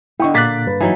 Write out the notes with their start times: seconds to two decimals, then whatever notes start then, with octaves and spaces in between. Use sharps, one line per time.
0.20 D3 B3 E4 D#5 G5 C#6
0.34 A#2 A#3 D6 F#6 A6 B6
0.67 G2 B4
0.81 E3 F#3 D#4